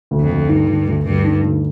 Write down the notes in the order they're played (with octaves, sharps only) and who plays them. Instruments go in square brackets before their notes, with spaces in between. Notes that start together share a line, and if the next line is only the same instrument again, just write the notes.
[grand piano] D2
[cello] F2
[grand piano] D2
[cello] G2 [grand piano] D#3
[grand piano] D2
D2
[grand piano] D2 [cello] G2
[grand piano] D#3
D2